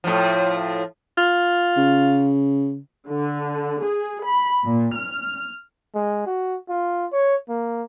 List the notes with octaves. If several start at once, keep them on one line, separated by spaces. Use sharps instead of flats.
A2 F3
F4
C#3
D3
G#4
B5
A#2
F6
G#3
F#4
F4
C#5
A#3